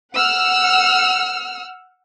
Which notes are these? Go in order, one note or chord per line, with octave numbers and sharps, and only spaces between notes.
F#5 E6 F6